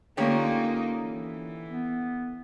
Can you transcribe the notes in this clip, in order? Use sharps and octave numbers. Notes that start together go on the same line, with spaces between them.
D3 A#3 C#4 D#4 F4 G4 C#5
E3
B3